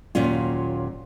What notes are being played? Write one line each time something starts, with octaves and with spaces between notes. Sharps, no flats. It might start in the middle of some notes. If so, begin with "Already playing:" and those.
D#2 A#2 F#3 C#4 F4